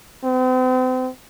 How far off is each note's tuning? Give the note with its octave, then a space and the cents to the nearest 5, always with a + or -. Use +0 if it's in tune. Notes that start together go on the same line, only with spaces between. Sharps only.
C4 -40